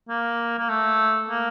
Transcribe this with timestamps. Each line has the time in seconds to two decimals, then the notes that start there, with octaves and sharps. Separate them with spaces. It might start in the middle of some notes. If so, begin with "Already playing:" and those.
0.09 A#3
0.59 A#3
0.69 A3
1.30 A#3